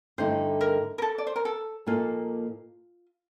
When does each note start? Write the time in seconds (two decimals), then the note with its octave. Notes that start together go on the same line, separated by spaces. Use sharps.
0.18 G2 D3 A3 D#4 C5
0.61 A#4
0.98 A#4
1.02 A4
1.18 D5
1.27 C5
1.36 A#4
1.45 A4
1.87 A#2 F3 A#3 D#4 F4 A4